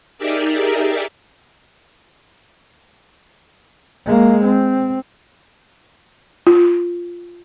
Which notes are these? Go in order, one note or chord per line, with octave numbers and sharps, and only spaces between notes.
D#4 G4 G#4 A#4 D5 E5
G#3 A#3
C4
F4